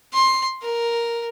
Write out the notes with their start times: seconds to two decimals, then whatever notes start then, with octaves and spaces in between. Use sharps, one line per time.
0.13 C6
0.62 A#4